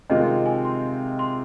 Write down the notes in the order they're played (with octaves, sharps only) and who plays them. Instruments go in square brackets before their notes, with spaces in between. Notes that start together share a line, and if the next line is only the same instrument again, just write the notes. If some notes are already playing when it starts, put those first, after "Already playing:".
[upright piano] C3 D#3 G#3 C4 F4 [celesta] D#5
[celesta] G5
G#5
C6
C6